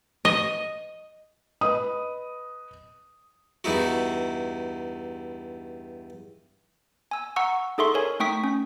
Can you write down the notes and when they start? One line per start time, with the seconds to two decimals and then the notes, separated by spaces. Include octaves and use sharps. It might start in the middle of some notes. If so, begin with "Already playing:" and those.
0.25 D#5
1.61 B4 D#5 D#6
3.64 E2 G2 D#4 E4 F#4
7.11 G#5 E6
7.36 F#5 A#5 C#6 E6
7.78 D#4 G#4 A4 E5 C6 C#6
7.94 A#4 C#5 G#5
8.20 A3 D#4 G5 C#6 D#6 B6
8.44 C#4